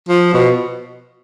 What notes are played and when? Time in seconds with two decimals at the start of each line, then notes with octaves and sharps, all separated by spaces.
0.09 F3
0.34 B2